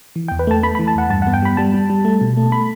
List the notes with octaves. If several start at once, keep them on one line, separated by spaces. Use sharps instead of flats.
E3
E2 G5
B4
A3 A5
A3 B5
E3 B5
A5
E2 F#5
G2 A5
B3 F#5
G5
G3 B5
G3 A5
G3
G3
A3
B2
A3
A3 B5